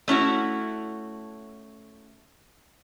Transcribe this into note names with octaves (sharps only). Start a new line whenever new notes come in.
A3 C#4 E4 F#4